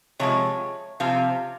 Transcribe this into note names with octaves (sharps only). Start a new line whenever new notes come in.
C3 F3 G#3 C#5
C3 F3 F5